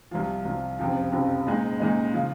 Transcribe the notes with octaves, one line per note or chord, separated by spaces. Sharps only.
C2 C3 F3
C2 C3 F3
F#1 F2 C3 F3
F#1 F2 C3 F3
A#2 G#3 D#4
A#2 G#3 D#4
C#3 F3